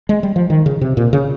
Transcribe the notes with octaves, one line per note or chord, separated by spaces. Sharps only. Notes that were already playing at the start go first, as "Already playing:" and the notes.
G#3
G3
F3
D#3
C#3
C3
A#2
C#3